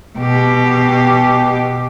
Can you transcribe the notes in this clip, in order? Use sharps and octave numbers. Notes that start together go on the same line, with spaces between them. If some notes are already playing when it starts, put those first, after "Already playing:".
B2 G4